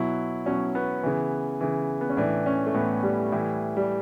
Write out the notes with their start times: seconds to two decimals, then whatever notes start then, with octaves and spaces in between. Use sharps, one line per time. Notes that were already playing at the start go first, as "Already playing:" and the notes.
Already playing: B2 F#3 E4
0.46 B2 F#3 C#4
0.75 B3
1.03 C#3 E3
1.61 C#3 E3
2.01 B3
2.10 C#4
2.17 A2 E3 D4
2.46 C#4
2.66 A3
2.74 A2 E3 B3
3.03 G3
3.32 A2 E3
3.77 G3